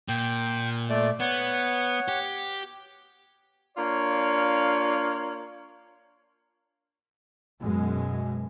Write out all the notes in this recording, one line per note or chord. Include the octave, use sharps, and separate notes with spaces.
A#2 G5
A3 D5
B3 C#5 F#5
G4
A#3 D4 F4 C#5 F5
F#2 B2 G#3